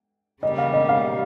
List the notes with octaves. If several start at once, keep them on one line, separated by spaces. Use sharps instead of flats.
C#3 G3 A#3 D#5
F5
D#5
F5